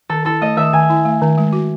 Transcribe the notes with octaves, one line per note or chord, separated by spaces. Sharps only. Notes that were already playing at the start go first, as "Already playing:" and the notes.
D#3 A4
E4 A4
A3 D#5
D#3 E5
D#3 G#5
E4
A3
D#3
G#3
F#4